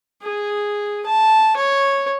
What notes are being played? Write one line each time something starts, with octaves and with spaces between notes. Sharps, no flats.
G#4
A5
C#5